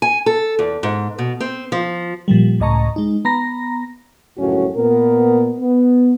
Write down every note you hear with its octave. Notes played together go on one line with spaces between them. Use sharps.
G#5
A4
E2
G#2
B2
C4
F3
A#2 F3 G3
C#2 A2 D#5 A5 A#5 C#6
G#3 D#4
B3 A#5 B5 A#6
G1 C#2 F#2 A2 C#4 F#4
A#2 B3 A#4
B3